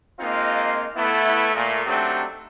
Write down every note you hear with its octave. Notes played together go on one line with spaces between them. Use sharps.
G#3 A#3 C4 D#4 F4
A3 B3 E4
A#2 A3
F#3 A3 C4 D4 D#4 G4